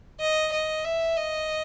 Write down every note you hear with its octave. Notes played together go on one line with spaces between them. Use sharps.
D#5
D#5
E5
D#5